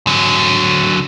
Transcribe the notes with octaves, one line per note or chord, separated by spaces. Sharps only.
D3 F#3